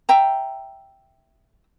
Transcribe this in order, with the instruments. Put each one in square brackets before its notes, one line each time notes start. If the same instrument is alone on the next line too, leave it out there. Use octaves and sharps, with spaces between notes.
[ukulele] E5 G5 A#5